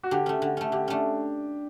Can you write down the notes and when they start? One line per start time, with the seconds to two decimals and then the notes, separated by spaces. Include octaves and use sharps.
0.03 F#4
0.11 D3 G4
0.26 A3 C#4
0.42 D3
0.57 A3 C#4
0.72 D3 G4
0.88 A3 C#4 D4